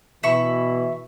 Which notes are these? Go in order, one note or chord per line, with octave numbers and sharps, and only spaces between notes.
B2 E3 E5 B5 C#6